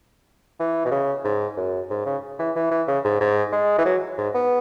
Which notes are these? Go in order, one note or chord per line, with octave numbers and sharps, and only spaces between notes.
E3
B2
C#3
G#2
F#2
G#2
C#3
E3
E3
E3
C#3
G#2
G#2
G#3
E3
F#3
G#2
B3